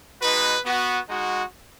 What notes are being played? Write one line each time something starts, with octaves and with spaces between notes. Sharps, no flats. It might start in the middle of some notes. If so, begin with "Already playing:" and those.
G#3 D#4 F#4 B4
B3 F#4
G#3 D#4 F#4